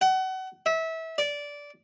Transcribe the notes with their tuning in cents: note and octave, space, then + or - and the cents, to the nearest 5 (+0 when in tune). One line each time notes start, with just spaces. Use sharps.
F#5 +30
E5 -25
D5 -15